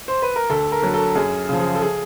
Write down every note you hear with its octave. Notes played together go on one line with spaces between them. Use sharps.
C5
B4
A#4
D2 A4
A#4
D3 F#3
A4
F#2 G#4
C#3 F3
G#4
A4
G#4